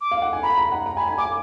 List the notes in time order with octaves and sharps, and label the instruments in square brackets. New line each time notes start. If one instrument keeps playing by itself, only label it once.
[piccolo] D6
[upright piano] F5
F#5
G#5
[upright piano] A#5 [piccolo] B5
[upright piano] A#5
F#5
A#5
[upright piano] G#5 [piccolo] B5
[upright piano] G#5
[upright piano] G#5 [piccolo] D6